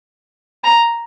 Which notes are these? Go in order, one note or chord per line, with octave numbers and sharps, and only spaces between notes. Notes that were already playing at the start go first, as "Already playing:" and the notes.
A#5